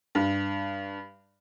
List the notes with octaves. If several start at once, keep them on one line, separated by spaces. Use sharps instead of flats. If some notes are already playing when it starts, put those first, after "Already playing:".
G2